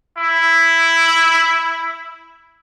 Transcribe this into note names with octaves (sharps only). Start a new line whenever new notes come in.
E4